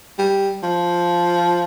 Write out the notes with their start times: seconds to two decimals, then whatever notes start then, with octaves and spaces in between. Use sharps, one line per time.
0.18 G3
0.63 F3